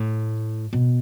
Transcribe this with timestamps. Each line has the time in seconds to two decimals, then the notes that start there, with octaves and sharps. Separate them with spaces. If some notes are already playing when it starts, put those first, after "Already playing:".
Already playing: A2
0.73 B2